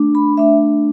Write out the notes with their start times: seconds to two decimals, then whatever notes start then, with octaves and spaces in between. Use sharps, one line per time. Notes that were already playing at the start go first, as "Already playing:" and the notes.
Already playing: A3 D4
0.15 B5
0.37 A3 D4 E5